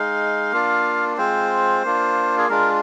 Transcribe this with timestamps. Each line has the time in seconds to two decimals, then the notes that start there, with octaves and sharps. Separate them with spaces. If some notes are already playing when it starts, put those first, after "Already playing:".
Already playing: G#3 D#4 F5
0.52 A#3 D4 F4
1.17 G#3 C4 F4 C5
1.84 A#3 D4 F4
2.38 G#4
2.49 G#3 D4 F4 A#4